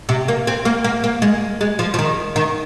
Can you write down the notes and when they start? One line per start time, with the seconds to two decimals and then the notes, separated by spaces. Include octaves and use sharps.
0.09 C3
0.28 A#3
0.47 C4
0.65 A#3
0.84 A#3
1.04 A#3
1.22 G#3
1.61 G#3
1.79 F3
1.94 F3
1.99 D#3
2.36 D#3